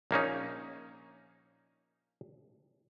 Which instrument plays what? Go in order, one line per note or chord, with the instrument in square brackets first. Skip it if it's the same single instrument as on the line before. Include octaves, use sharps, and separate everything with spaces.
[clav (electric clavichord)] A#1 A#3 C#4 D#4